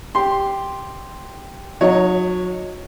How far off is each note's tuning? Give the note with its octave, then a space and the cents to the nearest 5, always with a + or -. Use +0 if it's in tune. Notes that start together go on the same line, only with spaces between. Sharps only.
G4 +0 C6 +0
F#3 -35 D#4 +0 C#5 +0